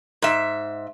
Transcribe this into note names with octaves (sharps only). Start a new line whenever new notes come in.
G#2 E5